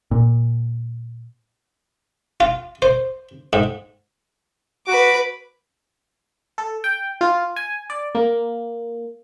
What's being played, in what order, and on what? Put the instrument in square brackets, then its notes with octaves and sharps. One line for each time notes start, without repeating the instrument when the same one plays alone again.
[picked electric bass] A#2
[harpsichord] F4
C5
G#2
[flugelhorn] F#4 [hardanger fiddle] B4 D6
[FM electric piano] A4
G5
F4
G#5
D5
A#3